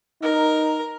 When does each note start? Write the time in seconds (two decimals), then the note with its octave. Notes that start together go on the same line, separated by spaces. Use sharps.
0.22 D#4 A#4